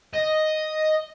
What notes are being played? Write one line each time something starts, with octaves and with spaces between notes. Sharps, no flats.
D#5